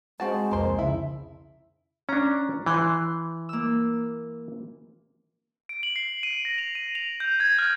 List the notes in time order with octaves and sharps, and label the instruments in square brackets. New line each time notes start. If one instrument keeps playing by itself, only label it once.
[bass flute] G#3 [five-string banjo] C4 F#4 A5
[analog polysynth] C2 F2 [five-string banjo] A#3 C5
[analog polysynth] C#3 [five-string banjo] E4
[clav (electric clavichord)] C#4 D4 [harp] A#5
[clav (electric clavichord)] E3 [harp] C6 F#6 G6
[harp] A#3 E6
[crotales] D7
F#7
C7
D#7
A#6
F7
D#7
F7
G6
G#6
F6